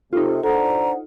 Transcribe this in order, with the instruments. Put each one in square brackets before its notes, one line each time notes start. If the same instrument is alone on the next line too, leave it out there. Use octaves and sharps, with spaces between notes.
[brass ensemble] C3 [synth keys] D#4 F4 [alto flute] A4
[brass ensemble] D4 C5 F#5 [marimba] A4 [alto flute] A#5